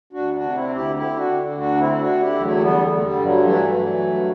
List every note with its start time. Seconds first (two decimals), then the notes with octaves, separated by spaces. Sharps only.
0.13 D2 D4 F#4
0.33 D4 F#4
0.41 C3
0.54 C4 E4
0.69 D2
0.75 E4 G4
0.95 D3 E4 G4
1.16 D4 F#4
1.23 D3
1.51 D2
1.57 D4 F#4
1.78 D3 C4 E4
1.99 D4 F#4
2.06 D3
2.20 E4 G4
2.33 E2
2.40 F#3 A3
2.61 D3 G3 B3
2.88 D3
2.96 A3
3.02 G3
3.16 G2
3.23 F#3
3.43 E3 F#3 A3
3.72 E3
3.99 G2